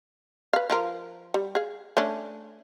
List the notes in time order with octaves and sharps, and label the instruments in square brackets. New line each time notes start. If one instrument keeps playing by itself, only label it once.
[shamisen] B4 F5
F3 F4 A#4
G3
G#4 F5
A3 C#4 D4